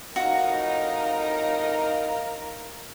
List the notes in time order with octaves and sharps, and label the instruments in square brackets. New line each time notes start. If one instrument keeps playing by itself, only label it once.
[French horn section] F2 A2 D#4 [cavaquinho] F#4 [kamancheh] A#4 A#5 [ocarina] F5